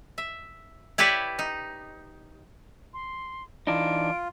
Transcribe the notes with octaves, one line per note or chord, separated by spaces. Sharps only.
E5
E4 G4 B4 C#5 D5 E5
D#4
C6
E3 D4 D#4 F4 D7